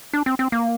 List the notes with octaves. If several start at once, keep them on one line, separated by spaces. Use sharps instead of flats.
D4
C4
C4
A#3